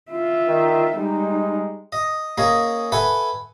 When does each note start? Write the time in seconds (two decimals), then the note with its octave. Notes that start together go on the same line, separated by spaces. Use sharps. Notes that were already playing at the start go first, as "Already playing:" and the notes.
0.11 F4 E5
0.47 D#3
0.96 G3 G#3 D#4
1.92 D#5
2.38 A#3 C#4 G#4 D#5
2.92 A4 B4 E5 F#5 G#5